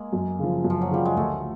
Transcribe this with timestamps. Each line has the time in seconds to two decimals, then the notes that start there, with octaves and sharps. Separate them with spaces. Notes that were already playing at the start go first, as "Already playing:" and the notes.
Already playing: G#3 A#3
0.13 F#2
0.39 C#3 F3
0.64 F#2
0.70 F3
0.81 F#3
0.91 C#3 F3 G3
1.05 G#3
1.16 D2 A3